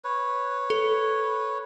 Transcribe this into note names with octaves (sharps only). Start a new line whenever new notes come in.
B4 C#5
A4